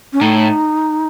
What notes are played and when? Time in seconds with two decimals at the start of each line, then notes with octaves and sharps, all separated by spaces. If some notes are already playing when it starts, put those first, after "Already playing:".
0.13 C#4
0.21 A2 D#4